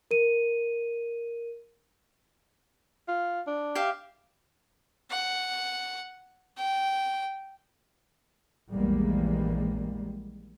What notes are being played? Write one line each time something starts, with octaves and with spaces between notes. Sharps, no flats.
A#4 D#7
F4
D4
G4 E5 F5
F#5
G5
A#1 E2 G3 G#3 A#3